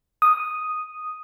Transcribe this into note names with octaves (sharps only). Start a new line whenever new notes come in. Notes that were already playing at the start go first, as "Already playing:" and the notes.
D#6